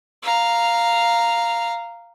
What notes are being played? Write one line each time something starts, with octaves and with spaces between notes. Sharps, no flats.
F5 A#5